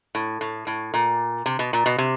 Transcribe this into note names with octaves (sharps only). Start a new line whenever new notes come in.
A2
A2
A2
A#2
C3
B2
A#2
B2
C3